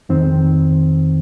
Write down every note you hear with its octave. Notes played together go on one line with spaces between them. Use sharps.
F2 D#3 C4